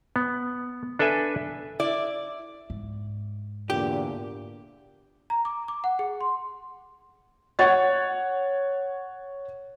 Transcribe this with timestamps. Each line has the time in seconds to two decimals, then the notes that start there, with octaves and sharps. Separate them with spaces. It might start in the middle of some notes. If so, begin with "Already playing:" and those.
0.16 B3
0.99 D4 A4 B4 E5 G#5
1.80 E4 D5
2.70 G#2
3.70 E2 A#2 D3 G4
5.30 A#5
5.45 D6
5.68 D6
5.84 F#5
5.99 G#4
6.21 C6
7.59 C#5 F#5 C#6 A6